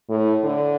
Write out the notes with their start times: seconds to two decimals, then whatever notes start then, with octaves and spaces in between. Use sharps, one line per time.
0.10 A2
0.44 D3